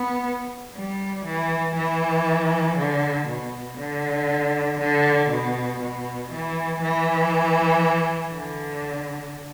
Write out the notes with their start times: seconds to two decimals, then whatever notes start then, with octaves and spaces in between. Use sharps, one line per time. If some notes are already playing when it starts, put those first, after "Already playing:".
Already playing: B3
0.75 G3
1.25 E3
1.75 E3
2.77 D3
3.27 B2
3.78 D3
4.79 D3
5.30 B2
5.81 B2
6.31 E3
6.81 E3
8.33 D3